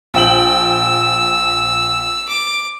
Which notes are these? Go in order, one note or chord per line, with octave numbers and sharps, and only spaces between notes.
A#1 G5 E6 F#7
D6